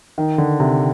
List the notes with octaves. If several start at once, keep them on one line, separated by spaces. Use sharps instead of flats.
D#3
D3
C3